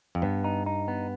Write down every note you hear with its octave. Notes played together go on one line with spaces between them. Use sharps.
F2
G2 B3
D#4
D#4
B3